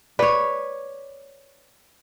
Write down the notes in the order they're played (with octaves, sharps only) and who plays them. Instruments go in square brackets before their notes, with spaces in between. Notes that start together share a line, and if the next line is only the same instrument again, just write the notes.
[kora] B4 C#5 [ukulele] D5